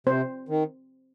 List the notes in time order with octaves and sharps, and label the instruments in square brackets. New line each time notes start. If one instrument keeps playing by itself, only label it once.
[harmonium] C3 [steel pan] C4 C5
[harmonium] D#3